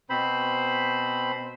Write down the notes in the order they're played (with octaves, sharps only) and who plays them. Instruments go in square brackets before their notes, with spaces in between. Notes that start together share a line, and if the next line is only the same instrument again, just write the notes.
[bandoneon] B2 C4 C5 B5